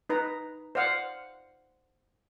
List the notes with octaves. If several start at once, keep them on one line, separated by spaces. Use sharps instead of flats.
D#4 B4 A#5
C5 D5 F5 F#5